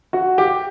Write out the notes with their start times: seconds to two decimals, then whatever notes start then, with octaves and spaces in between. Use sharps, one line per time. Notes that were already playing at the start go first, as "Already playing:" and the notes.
0.13 F#4
0.38 G4